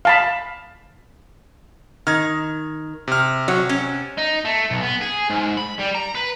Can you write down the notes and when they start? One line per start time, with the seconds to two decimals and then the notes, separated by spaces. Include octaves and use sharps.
0.05 F5 A5 B5
2.07 D#3 F6 G#6
3.08 C3 F6
3.48 F#3
3.69 C#4
4.18 D#4
4.45 A3
4.71 B1
4.83 B3
5.01 G#4
5.30 G#2
5.57 B5
5.79 G3
5.95 A#5
6.15 B4